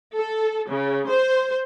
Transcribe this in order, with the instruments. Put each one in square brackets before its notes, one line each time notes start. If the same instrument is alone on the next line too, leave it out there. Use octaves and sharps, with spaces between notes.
[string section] A4
C#3
C5